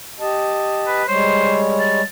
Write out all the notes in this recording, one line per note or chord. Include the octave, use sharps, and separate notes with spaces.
G4 D#5 A5
B4
G3 G#3 C5 C#5
A5